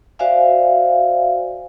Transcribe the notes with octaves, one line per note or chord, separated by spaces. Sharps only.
F#4 C5 D5 E5 F5 G#5